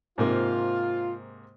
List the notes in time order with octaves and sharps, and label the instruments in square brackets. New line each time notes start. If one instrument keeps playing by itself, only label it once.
[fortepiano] G#2 C3 A#3 [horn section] F4